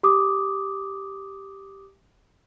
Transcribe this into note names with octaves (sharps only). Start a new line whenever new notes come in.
G4 D6 D#6